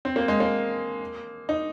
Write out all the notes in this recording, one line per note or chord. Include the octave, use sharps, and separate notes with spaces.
C4
A#3
G#3
A#3
D#4